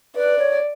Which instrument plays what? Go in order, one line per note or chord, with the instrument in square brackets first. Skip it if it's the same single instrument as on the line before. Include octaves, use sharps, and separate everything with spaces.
[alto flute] B4 [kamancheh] D5
[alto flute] C#5